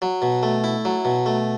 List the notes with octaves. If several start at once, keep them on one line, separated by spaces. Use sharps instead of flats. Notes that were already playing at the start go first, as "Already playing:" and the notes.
F#3
B2
A3
E4
F#3
B2
A3